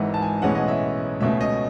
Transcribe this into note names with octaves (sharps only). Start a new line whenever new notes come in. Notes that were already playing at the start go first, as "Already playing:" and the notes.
Already playing: G#1 G#2 E3 D#5 E5 F#5
A5
G#5
B1 A2 E3 G#3 C#4 F#5
D#5
E5
C#2 B2 A3 C#4 E5
D#5